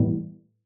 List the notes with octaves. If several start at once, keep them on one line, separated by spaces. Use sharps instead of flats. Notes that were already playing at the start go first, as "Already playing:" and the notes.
Already playing: A2 E3 G3 B3